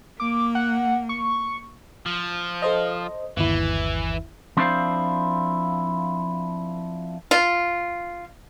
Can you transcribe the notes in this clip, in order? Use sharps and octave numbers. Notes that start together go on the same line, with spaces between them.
A#3 D6
F#5
C#6
F3
A4 C5 D#5
G1 D#2 E3 E4
F3 C4 D4 E4 C5 F5
F4